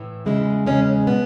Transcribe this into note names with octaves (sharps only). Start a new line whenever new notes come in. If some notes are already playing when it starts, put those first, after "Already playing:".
Already playing: A2 E3
E2 C#3 G#3 E4
E2 C#3 G#3 C#4
B2 B3